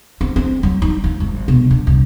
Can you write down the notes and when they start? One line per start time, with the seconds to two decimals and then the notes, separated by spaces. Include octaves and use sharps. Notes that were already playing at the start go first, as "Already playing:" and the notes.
0.21 C4
0.36 C4
0.63 F#3
0.82 D#4
1.04 F3
1.20 G#1
1.48 B2
1.71 D4
1.87 C2